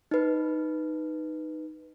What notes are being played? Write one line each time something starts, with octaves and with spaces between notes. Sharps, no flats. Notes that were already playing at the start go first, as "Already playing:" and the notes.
D#4 B4